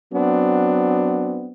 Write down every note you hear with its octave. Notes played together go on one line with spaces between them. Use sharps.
F#3 B3 C4 D4